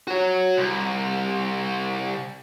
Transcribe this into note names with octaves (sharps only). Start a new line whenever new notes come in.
F#4 C#5
C2